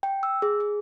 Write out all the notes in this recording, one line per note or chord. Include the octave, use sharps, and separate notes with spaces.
G5
E6
G#4
G#4